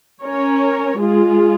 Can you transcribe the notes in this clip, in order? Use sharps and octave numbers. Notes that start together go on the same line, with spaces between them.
C#4 A#4 C#5
G#3 F4 G#4